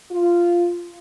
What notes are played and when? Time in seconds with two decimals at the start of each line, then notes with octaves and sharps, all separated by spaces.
0.11 F4